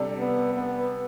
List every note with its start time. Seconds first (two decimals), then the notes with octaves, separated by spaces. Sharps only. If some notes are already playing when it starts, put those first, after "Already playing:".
Already playing: C3 G3 D4 A4 D5
0.19 B3
0.53 B3